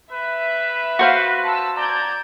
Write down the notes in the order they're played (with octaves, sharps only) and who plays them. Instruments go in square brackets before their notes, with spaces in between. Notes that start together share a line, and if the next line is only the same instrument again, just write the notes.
[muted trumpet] B4 [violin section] E5
[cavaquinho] F#4 C5 F5
[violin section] A5 E6
[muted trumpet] D5 [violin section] A#5 G6 G#6